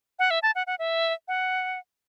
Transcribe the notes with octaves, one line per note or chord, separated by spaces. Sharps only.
F#5
E5
A5
F#5
F#5
E5
F#5